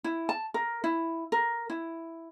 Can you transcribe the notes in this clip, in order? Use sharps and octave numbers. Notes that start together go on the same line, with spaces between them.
E4
A5
A#4
E4
A#4
E4